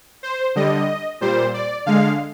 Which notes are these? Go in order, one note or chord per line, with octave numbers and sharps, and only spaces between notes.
C5
D3 G3 D#5
A#2 G3 C5
D5
D3 G#3 F5